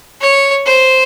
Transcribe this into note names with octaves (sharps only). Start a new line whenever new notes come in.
C#5
C5